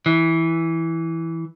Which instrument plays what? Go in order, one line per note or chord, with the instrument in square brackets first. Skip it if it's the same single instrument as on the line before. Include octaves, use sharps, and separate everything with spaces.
[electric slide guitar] E3